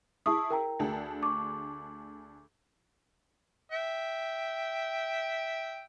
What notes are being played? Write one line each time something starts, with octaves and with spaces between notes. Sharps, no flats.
E4 G#4 A5 C#6 D#6
A#4 G5 A#5
D2 D4 G#4
C#6 D6
E5 G5